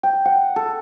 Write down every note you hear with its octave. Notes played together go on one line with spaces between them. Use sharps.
G5
F#5
A4